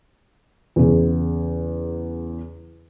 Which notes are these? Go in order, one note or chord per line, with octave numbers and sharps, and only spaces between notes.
E2 C#3